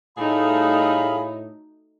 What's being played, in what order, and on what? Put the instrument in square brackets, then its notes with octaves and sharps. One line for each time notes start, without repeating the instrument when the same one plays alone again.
[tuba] A2 [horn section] G3 G#4 F5 [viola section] A3 D#4 F#4 [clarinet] B5